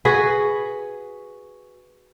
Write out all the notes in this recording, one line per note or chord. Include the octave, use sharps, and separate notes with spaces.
F#4 G#4 B4